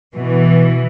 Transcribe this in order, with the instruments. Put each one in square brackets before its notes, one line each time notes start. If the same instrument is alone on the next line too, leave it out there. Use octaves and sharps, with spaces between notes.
[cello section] B2 E3